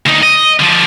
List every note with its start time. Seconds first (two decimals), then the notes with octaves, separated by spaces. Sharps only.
0.06 D2 D#4
0.23 D#5
0.59 D3 F3